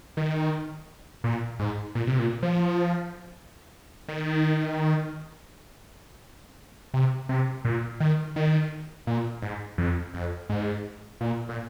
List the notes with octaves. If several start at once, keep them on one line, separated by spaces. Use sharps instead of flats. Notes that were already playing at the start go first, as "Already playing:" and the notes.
D#3
A#2
G#2
A#2
C3
A#2
F3
D#3
C3
C3
A#2
D#3
D#3
A#2
G#2
F2
F2
G#2
A#2
A#2